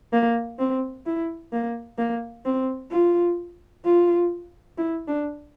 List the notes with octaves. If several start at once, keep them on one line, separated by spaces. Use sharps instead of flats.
A#3
C4
E4
A#3
A#3
C4
F4
F4
E4
D4